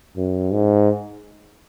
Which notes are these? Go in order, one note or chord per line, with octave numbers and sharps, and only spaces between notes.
F#2
G#2